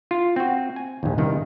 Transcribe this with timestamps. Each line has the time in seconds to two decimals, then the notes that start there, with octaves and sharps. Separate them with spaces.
0.11 F4
0.36 C4 F#4
0.76 G#5
1.03 A#1 D#2
1.18 C2 G2 D#3